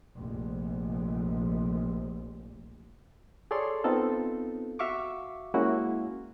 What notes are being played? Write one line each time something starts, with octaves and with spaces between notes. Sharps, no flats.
F1 A#1
G#4 A4 C#5 D5 C6
B3 C4 D#4 F4 A4
F#4 E5 F5 C#6 D6
G#3 A#3 C#4 E4 F#4